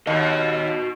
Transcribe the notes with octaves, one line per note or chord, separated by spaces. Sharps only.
D#2 F#4 D#5